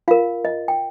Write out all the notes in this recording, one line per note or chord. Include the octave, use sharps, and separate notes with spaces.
F4 A#4 F5
D#5
G5